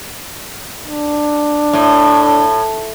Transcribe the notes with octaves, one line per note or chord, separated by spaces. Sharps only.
D4
A2